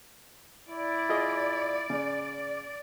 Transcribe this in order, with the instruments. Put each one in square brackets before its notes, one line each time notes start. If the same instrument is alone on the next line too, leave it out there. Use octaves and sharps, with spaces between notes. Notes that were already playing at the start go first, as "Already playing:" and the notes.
[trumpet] E4 [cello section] D5
[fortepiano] F4 G#4 D#5
C#3